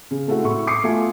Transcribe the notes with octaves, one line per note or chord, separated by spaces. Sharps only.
C#3
G#3 A3 C4 E4 F#4 A4
A2 C#6
D6 D#6 C7 C#7
A3 B3 F4 E5 G#5